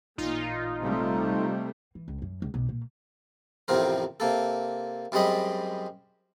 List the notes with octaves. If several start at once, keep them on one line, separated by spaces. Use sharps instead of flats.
A1 A#2 D#4 F4
C3 G3 A3
E3
C#2
F#2
C#2
B1
A#2
A1 F2 A2 C3 C4 A#4
C3 A#3 A4
F#2 G3 G#3 C4 D#5 B5